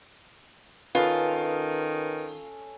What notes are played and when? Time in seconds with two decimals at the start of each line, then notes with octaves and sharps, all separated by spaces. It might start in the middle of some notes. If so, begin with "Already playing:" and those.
0.95 D#3 C#4 F4 A4 B4 D#5